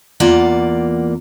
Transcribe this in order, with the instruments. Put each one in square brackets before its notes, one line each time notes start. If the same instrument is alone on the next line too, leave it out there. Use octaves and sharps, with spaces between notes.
[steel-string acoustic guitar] E2 A#3 F4 D5 F#5